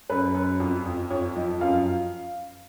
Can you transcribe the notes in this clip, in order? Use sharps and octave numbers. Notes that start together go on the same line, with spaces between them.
F#2 B4
F#2
F2
F2
F2 C#5
F3 D#5
F#2 F5